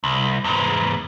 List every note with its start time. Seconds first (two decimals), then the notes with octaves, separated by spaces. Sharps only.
0.04 C2
0.44 E2 G#2